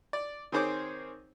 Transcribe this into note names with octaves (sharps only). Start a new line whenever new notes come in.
D5
D#3 C4 G#4 C5 C#5 D6